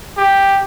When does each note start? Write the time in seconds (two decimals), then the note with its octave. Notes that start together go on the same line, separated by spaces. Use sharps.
0.17 G4